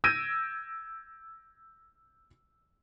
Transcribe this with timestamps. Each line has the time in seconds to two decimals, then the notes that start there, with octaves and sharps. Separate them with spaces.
0.04 E6 G6 G#6 A#6 D7 D#7